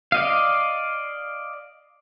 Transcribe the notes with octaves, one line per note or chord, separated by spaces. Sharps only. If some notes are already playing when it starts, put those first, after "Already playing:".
D5 D#5 F5